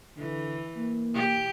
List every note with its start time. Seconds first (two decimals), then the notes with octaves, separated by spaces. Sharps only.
0.17 D3 E3
0.76 A#3
1.14 G4